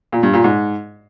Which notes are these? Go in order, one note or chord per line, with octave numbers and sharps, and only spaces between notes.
A#2
G2
A#2
G#2